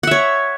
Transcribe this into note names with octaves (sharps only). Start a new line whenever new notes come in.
C#5 E5 F#5